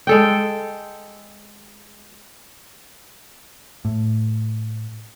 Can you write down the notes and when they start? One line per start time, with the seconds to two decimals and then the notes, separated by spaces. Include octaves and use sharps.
0.07 G#3 A4 G5
3.85 A2